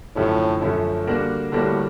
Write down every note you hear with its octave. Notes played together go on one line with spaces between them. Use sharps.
F#2 A2 D3 F3 A3 C#4
F#2 D3 F3 A3 C#4
D3 G3 A#3 D4 F#4
A2 D3 G3 A#3 D4 F#4